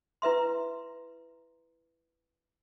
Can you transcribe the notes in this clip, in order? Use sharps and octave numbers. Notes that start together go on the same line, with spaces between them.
E4 B4 E5 C6